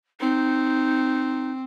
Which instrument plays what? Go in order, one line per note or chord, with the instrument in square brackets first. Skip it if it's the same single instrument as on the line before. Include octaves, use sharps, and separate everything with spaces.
[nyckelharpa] C4 [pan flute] D#4